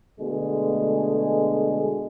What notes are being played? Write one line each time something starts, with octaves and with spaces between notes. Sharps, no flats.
B2 D3 G#3 A3 G#4